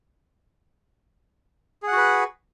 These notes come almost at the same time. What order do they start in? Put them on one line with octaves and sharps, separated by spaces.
G#4 F#5 F#4 B4